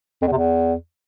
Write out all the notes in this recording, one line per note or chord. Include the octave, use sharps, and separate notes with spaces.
F2
E2
C3
E2